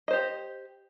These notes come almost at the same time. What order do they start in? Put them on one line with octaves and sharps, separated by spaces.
D#5 C5 G4